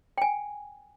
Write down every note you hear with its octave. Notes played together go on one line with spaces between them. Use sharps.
G5 G#5